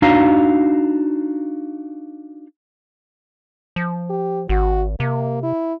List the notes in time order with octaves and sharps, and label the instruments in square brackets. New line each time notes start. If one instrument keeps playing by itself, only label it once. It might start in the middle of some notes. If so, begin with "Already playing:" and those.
[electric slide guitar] D4 D#4 F#4 F5 A#5
[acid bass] F3
[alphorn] G4
[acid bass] G#1 [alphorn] F#4
[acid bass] C3 [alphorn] A#3
[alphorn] E4